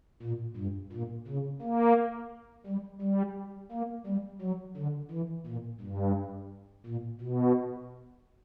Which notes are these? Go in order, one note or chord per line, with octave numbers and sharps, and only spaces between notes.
A#2
G2
A#2
C#3
A#3
G3
G3
A#3
G3
F#3
D3
E3
A#2
G2
A#2
B2